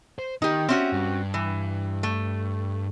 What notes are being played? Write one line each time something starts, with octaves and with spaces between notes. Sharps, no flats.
C5
D#3 D#4 G4
C4 C#4 F#4 E5
G2
E3
A3